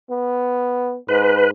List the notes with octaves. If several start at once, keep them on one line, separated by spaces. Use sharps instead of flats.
B3
G#2 B4